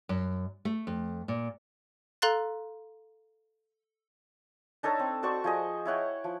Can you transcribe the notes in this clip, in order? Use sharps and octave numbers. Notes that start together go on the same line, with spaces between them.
F#2
A3
F2
A#2
A4 F5 A#5 C6 F#6 A6
D4 D#4 A4 C#5
C4
F#4 C5 D5 C#6
F3 G#4 D#5
E4 C#5 F#5 G5
F3